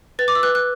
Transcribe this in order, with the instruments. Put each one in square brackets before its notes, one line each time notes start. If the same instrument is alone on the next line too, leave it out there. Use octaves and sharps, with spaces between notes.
[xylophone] B4 A6
D6
E6
B4 F#6
F#6